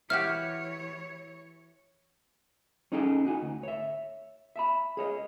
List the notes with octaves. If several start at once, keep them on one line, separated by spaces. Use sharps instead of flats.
E3 E4 F#4 G4 C#5 F6
C#4 D#4 G#4 A4 G5
D#4 F#4 G#5
D2
C#5 E5
E5 A5 B5
G#4 C#5 D#5